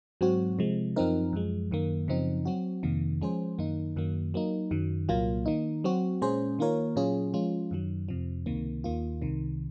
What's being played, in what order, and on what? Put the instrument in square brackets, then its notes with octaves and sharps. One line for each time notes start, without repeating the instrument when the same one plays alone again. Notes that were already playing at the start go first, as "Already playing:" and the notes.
[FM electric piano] G#2 F#3 C4 F#4
C3 F3 G#3
F#2 F3 C4 D#4 A#4
F#2 F3 G#3
F#2 D#3 A#3
F#2 C#3 F3 C4 D#4
F#3 C4 F#4
F2 C3 D#3 A#3
F3 G#3 C#4 G#4 C5
F#2 D#3 A#3 D#4
F#2 D#3 F#3 A#3
F#3 A#3 D#4
F#2 D#3 F#3
C2 A#2 F#3 A#3 F4
D#3 A#3 D#4
F#3 C4 F#4
A#2 G#3 C#4 G#4 C5
D#3 A#3 F4 A#4 C#5
A#2 F#3 C#4 F4 G#4
F3 G#3 C#4 F4
F#2 D#3 F#3
F2 C3 F3
C#2 C3 D#3 A#3
D#2 D#3 A#3 F4
C2 C3 D#3